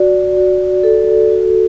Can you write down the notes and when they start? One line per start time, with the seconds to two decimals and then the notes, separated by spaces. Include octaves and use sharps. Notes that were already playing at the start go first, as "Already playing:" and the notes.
Already playing: F#4 D5
0.37 F#4
0.83 A4
1.32 F#4